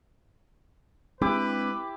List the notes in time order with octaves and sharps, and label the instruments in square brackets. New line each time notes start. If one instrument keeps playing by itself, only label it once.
[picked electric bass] G#3 C4 D4 [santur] E4 G4 D6 [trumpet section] B4